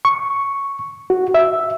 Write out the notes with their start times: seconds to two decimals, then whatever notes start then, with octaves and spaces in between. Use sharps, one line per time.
0.05 C#6
1.10 F#4
1.34 E5